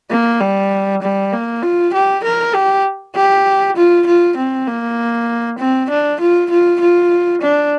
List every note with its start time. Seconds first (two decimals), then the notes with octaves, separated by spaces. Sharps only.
0.11 A#3
0.40 G3
1.02 G3
1.32 A#3
1.62 F4
1.93 G4
2.24 A#4
2.54 G4
3.15 G4
3.77 F4
4.07 F4
4.37 C4
4.67 A#3
5.58 C4
5.90 D4
6.20 F4
6.50 F4
6.81 F4
7.42 D4